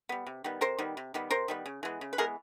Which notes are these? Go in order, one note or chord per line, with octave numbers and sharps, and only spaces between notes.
G3 B3
C3
D#3 G3 B3
C3 A#4 C5
D#3 G3 B3
C3
D#3 G3 B3
C3 A#4 C5
D#3 G3 B3
C#3
E3 G#3 B3
C#3
B4
E3 G#3 B3 G#4 A#4